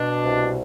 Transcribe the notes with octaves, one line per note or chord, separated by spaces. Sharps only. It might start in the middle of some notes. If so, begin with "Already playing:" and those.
Already playing: B2 D4
C2